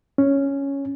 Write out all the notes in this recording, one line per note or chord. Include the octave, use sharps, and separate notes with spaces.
C#4